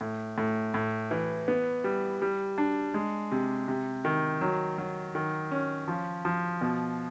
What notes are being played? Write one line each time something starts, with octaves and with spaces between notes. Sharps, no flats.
A2
A2
A2
E3
B3
G3
G3
D4
G#3
C3
C3
D#3
F#3
F#3
D#3
C#4
F3
F3
B2